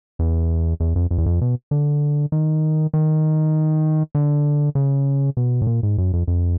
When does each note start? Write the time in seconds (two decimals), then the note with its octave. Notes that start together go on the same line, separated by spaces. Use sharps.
0.19 E2
0.80 E2
0.96 F2
1.11 F2
1.18 E2
1.26 F2
1.41 B2
1.71 D3
2.32 D#3
2.93 D#3
4.15 D3
4.75 C#3
5.37 B2
5.61 A2
5.67 A#2
5.83 G#2
5.98 F#2
6.13 F2
6.27 F2